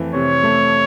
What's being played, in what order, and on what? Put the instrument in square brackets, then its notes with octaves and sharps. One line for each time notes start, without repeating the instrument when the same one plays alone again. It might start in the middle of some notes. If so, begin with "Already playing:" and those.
Already playing: [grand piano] F2 E3 A3
[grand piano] C3 [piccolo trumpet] C#5
[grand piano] A3